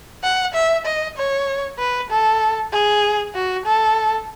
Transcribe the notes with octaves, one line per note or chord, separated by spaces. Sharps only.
F#5
E5
D#5
C#5
B4
A4
G#4
F#4
A4